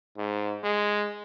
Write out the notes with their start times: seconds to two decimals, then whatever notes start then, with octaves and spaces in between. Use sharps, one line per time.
0.18 G#2
0.64 G#3